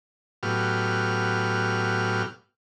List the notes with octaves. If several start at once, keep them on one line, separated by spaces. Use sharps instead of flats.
A2 F#3 B3 G4 F6